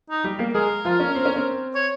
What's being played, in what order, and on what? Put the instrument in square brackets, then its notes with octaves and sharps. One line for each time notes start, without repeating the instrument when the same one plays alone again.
[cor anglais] D#4
[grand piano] G3 G4
A#3 A#4
[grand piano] G#3 G#4 [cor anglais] A#4
[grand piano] F3 F4
C#4
C4
C#4
C4
[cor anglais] C#5